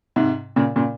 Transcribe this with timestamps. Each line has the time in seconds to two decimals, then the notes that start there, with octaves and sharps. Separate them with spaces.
0.16 G#2 C3
0.56 A#2 C#3
0.76 A#2 C#3